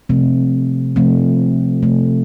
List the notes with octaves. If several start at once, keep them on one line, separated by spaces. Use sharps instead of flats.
C3 F3 A3 C4
C3 F3 A3 C4
C3 F3 A3 C4